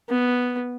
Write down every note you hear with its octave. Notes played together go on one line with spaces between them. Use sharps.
B3